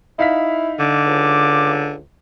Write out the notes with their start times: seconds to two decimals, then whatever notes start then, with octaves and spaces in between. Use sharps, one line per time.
0.19 D#4 E4 F5 B6
0.79 D3 D6
1.06 C#2